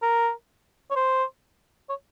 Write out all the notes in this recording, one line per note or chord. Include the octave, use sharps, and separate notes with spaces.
A#4
C#5
C5
C#5